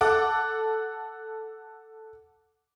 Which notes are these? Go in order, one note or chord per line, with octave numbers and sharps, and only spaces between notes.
A4 F#5 D6